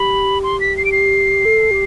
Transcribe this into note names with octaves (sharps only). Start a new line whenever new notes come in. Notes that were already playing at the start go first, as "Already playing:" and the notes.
Already playing: G4 B5
C6
B6
C7
D7
C7
A4
G4